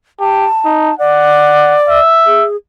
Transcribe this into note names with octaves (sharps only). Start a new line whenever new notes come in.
G4 A5
D#4
D5 F#5
E5
G#4